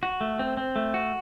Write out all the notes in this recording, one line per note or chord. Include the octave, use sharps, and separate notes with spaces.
F#4
A3
C4
C4
A3
F#4